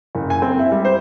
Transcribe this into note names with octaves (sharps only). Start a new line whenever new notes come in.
F#1
G#5
C4
E4
G3
C5